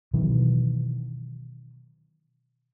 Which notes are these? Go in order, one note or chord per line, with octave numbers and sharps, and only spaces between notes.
B2 D#3 E3 F#3